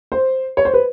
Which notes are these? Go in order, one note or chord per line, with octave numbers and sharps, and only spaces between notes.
C5
C#5
C5
B4